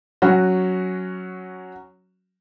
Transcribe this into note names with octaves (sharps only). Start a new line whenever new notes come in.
F#3 C#4 F#4